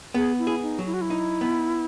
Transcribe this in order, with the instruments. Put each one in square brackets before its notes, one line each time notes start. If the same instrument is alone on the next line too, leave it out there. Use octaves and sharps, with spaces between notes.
[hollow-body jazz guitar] B3 [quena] G#4
[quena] E4
[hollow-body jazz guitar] G#4
[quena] D#4
[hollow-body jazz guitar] F#3
[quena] E4
F#4
E4
[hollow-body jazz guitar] D#4
B3